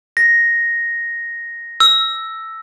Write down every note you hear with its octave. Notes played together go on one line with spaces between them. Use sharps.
A#6
E6